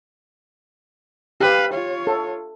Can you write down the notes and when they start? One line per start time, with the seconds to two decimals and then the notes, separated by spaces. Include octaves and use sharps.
1.41 G4 B4 F5
1.73 F4 C#5
2.07 A4